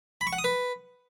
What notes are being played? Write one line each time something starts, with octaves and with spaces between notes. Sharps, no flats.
B5
C#6
F#5
D#6
B4